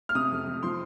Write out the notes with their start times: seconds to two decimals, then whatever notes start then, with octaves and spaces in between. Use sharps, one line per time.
0.09 F6
0.15 C3 D#6
0.32 F2
0.47 F2
0.63 F3 C6